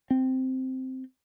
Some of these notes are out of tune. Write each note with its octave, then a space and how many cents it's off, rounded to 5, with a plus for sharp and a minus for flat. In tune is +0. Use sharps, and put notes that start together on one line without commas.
C4 -5